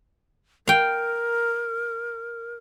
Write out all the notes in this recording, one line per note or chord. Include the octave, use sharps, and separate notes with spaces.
A#4 F5 G5